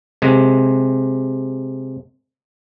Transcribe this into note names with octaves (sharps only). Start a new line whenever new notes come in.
C3 G#3